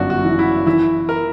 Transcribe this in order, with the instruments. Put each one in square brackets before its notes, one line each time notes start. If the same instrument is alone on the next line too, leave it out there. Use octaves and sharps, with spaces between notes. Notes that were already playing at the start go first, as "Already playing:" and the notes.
Already playing: [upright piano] G1 F#2 [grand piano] D4 F#4
[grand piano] F#4
[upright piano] E3
[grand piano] E4
[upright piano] E3 [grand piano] E4
[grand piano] A#4